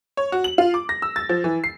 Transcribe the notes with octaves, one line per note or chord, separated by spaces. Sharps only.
C#5
F#4
F#7
F4
D6
A#6
E6
A6
F3
E3
C7